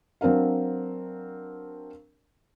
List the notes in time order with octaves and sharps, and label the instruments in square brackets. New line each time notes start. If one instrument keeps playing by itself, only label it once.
[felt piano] F#3 C4 D4 A#4 F5